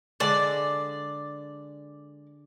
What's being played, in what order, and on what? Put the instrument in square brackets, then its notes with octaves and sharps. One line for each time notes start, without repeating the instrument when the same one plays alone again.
[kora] D3 G#3 A4 [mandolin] D5